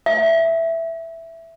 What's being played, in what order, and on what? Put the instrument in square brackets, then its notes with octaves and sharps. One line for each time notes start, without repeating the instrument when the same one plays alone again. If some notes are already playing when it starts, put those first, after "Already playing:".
[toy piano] E5